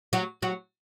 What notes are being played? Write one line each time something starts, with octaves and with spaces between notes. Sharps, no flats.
F#3 F#4
F#3 F#4